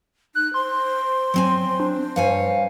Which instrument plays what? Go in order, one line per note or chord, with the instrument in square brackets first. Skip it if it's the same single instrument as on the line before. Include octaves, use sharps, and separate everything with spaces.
[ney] D#4 [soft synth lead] F#6
[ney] C5 [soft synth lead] C6
[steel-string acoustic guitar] F#3 C4 G#5
[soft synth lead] D4
[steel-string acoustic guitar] G2 C#5 G#5 [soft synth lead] F5